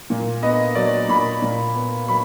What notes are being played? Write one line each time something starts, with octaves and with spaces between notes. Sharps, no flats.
A#2
B3 D#5
F#3 D5
A#2 B5
A#2
B3
F#3 B5